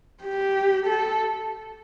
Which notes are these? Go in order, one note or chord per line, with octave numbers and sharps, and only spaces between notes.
G4
A4